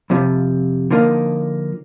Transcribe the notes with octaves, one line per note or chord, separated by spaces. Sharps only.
F2 C3 F3
D3 F3 A#3 D#4